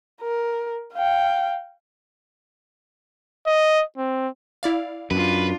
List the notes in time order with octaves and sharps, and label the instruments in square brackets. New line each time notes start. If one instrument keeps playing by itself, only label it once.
[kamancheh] A#4
F5 G5
[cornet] D#5
C4
[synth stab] E4 D5 F5
[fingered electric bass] F#2 [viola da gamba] D4 F4 [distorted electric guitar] B4